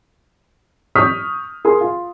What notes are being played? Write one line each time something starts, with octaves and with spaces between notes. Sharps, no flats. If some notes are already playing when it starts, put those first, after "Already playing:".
C#6 D#6 F6 G6 B6
G#4 A#4 G#5 C6
F4